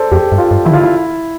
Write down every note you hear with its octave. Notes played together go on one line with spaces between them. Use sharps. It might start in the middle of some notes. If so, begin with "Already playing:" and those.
Already playing: A4 C5 D5
F2 G4
G2
F4
G2
E3 E4
D3 F4
E4